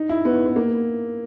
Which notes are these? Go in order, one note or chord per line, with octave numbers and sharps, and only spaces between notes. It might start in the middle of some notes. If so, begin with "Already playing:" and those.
Already playing: D#4
E4
B3
B3
A#3